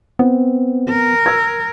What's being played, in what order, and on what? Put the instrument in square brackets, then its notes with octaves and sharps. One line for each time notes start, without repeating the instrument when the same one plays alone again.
[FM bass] B3 [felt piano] C4
[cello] A#4
[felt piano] E6 G#6